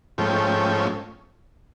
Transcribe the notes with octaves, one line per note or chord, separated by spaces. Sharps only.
G#2 F3 A3 C#4 G5